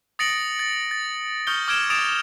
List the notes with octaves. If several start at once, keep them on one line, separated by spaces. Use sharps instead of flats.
D#6 A6 A#6 C#7 D7 F#7
A6
A6
C#6 D#6 F6 G6 C#7 G7
D6 F6 G#6 D7 E7 G7
D#6 A6 D7 E7 F7